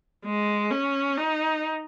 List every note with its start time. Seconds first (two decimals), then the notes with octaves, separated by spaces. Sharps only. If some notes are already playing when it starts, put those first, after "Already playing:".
0.25 G#3
0.71 C#4
1.17 D#4